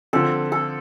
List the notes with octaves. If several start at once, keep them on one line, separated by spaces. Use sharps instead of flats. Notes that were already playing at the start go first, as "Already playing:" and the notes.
D3 F3 C4 A4
A4